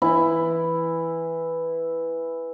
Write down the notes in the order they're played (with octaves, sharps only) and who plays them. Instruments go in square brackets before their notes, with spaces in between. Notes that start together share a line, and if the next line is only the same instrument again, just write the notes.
[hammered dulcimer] E3 E4